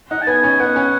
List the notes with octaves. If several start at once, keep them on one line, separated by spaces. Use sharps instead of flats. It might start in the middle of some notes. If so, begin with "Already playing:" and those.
D#4 F#5
A5
B3 G#5
C#4
B3 F#5
C#4